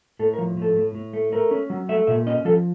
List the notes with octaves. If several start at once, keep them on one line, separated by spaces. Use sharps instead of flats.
A2 A4
A#4
F3
A2
A4
A2
A2
A3
A3 A#4
C#4
F#3
A3 E5
A#2 E5
C#4 D#5
F3 A4